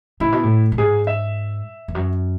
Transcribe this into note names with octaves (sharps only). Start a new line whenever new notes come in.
A2 E4
B2
A2
A2
G#2 G#4
E5
E2
F#2